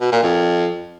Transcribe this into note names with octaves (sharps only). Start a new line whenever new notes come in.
B2
A#2
F2